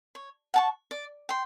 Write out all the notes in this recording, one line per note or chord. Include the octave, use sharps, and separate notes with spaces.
C#5
F#5 A5 C#6
D5
G5 C6